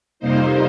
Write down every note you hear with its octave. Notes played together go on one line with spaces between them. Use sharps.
F2 C3 G3 A#3 D#4 C5